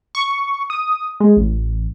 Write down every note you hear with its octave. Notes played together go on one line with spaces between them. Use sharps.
C#6
D#6
G#3
A1